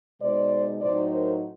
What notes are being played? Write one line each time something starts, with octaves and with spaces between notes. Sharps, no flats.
B2 G#3 C4 D#4 C5 D5
A2 F#3 A3 C4 D#4 C5 D5
A#4 C5